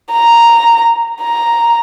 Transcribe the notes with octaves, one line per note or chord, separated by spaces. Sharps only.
A#5
A#5